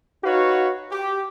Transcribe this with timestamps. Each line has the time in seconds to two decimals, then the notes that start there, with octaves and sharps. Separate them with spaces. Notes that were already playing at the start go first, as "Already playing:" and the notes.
0.24 D#4 F#4 B4 C#5 F5
0.91 G4